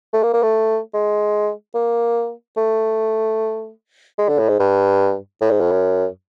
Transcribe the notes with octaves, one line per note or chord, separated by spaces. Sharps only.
A3
A#3
A#3
A3
G#3
A#3
A3
G#3
D3
A2
G#2
G2
A2
G#2
F2
F#2